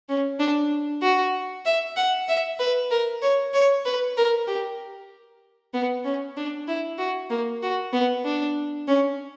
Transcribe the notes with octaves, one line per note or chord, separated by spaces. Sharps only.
C#4
D4
F#4
E5
F#5
E5
B4
A#4
C#5
C#5
B4
A#4
G4
B3
C#4
D4
E4
F#4
A#3
F#4
B3
D4
C#4